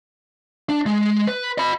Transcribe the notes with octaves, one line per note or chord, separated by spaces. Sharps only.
D4
G#3
B4
D#5 B5